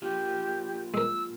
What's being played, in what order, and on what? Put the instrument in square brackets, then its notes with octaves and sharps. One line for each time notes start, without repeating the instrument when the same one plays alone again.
[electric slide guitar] A#3 D4 F4 [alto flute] G4
[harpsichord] G#3 A#4 [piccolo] E6